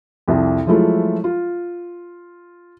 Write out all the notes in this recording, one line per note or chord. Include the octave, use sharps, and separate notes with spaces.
C2 F2
F3 F#3 G#3 A3 E4 F4
F4